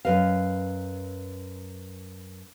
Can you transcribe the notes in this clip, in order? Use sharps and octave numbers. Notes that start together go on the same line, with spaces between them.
F#2 B4 D#5 F5